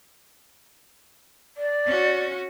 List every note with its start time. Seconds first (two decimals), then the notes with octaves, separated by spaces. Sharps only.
1.57 D5
1.86 C#4 F#4